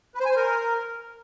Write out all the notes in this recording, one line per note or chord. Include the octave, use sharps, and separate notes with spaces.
B4
C5
G#5
C5
A#4